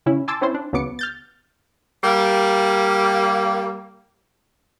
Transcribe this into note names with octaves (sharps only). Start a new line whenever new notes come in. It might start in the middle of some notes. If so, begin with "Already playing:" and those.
C#3 C#4 E4
G#5 A5 C6 D6 E6 A6
C4 C#4 E4 C5
D4
C#2 C#3 F#3 B3 D6 C#7
F6 G6 A6
G3 A#3